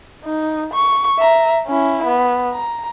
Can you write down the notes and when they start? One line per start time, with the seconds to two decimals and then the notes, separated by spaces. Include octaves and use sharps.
0.25 D#4
0.74 C#6
1.18 E5 A#5
1.67 C#4 E4
2.05 B3
2.53 A#5